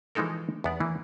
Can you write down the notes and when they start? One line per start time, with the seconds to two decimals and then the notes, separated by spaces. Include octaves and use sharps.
0.15 E3 F3 G#3 D#4 A4 A#4
0.64 E2 B3 D5
0.80 E3 A#3